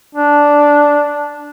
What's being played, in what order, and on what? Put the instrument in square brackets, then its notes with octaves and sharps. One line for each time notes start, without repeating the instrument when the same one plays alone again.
[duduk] D4